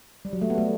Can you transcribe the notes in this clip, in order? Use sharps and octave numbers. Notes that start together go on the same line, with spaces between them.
G3
F#3
A3
B3
A3